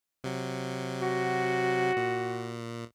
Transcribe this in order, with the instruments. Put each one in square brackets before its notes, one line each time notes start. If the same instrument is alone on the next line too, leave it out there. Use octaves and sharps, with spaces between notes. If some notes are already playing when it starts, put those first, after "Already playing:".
[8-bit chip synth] C3 F#3
[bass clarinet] F#4
[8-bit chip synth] A#2